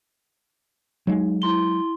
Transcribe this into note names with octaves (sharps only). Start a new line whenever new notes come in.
F#3 G#3 D#4
E4 C6 G7